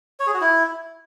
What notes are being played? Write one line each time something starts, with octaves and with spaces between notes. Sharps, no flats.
C#5
G#4
F#4
E4